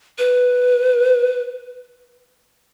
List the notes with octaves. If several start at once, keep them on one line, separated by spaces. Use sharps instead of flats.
B4